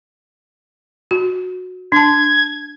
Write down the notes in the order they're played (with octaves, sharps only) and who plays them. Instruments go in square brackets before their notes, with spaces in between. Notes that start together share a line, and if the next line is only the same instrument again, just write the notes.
[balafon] F#4
[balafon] D4 A5 [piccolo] G#6